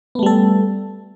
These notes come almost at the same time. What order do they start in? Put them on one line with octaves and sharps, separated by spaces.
B3 A3 G3 A4